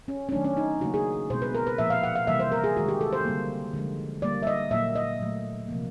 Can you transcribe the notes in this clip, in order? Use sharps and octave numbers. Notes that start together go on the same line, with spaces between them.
C#4
C#4
D#3 F#3 A3 D4
C#4
D#4
C#3 F#3 A#3 F#4
G#4
B2 G#3 C5
B4
A#4
B4
A#2 F3 A#3 E5
F5
F#5
F5
C3 E3 G3 A#3 E5
C5
A#4
G#4
D#3 G#3 F#4
G4
A4
C5
D3 G3 A#3
D3 F3 G#3
D3 G3 A#3 D5
E5
D#5
A#2 F#3 A#3 E5
D#5
A#2 F#3 A3
C3 F3 A#3